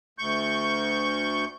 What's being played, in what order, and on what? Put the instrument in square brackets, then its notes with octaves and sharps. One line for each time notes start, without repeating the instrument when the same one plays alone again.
[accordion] D2 C#6 G6